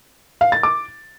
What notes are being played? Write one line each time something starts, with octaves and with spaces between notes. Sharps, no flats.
F5
A6
D6